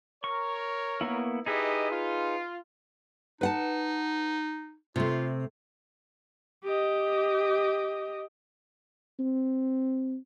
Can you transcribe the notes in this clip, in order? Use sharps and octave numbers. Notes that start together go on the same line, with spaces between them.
A#4 C#5 C#6
A#3 B3 E4
D#4 E4 G4 G#4 B4 D#5
F4
D#4 B4 F#5 A5
C3 A3 F4
G4 D#5
C4